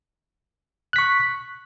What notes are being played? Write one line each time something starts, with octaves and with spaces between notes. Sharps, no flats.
C#6 F#6 B6